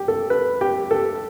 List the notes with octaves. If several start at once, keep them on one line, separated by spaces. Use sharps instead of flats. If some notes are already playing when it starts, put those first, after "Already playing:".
Already playing: G4
A4
B4
G4
A4